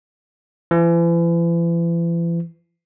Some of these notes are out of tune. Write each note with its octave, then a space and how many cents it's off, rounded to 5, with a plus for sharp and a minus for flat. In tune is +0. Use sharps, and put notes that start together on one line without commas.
E3 +40